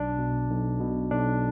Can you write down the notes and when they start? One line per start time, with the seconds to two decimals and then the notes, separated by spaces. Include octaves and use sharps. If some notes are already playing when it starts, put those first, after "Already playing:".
Already playing: B1 D4
0.18 B2
0.50 B1
0.80 B2
1.11 B1 D4